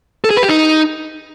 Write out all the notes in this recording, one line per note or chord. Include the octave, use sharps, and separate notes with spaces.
A4
G#4
B4
G4
D#4